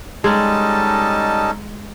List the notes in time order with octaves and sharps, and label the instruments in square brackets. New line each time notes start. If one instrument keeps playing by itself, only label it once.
[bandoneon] G3 D#5 A5 [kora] G#3 [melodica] C#4 D#4 A4